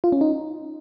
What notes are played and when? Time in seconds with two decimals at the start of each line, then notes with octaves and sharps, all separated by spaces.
0.04 F4
0.12 C#4
0.21 D#4